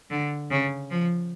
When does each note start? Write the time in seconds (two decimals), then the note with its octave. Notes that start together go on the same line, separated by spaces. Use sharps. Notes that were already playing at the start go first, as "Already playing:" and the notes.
0.10 D3
0.51 C#3
0.91 F3